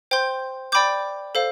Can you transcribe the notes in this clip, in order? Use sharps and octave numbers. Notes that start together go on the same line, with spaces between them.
C5 G5 C6 G6
D5 G5 B5 D6 G6
A4 C5 F5